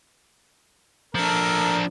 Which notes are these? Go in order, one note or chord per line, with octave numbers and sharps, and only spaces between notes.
F3 D4 A4 A#4